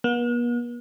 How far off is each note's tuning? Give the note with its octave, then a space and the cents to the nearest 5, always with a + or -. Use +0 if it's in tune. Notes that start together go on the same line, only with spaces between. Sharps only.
B3 -45